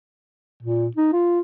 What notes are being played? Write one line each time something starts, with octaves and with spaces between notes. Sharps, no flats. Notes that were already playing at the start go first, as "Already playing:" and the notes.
A#2
D#4
F4